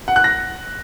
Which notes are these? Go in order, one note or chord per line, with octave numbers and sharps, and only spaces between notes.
F#5
F#6
A#6